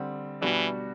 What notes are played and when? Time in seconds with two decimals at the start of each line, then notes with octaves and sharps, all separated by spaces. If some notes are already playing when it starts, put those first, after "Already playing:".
Already playing: D3 G3 C4
0.41 B2 E3 G3 D4 F#4